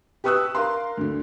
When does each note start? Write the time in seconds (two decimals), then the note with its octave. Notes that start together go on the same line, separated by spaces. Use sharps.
0.24 G4 B4 C#6 D#6 E6 F#6
0.55 A#4 F5 C6
0.97 D2 D3